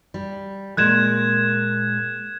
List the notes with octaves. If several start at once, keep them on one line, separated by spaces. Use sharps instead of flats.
G3
A#2 G#3 A#3 F#6 G#6 E7